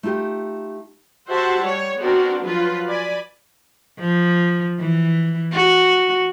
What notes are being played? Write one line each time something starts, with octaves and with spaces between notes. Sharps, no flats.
A3 D#4 F4 G4
F#4 G4 C5 E5 F#5 A5
G3 C#5
B3 C4 D4 F#4 A#4
F3 F#3 F4 B4
D5 G#5 B5
F3
E3
F#4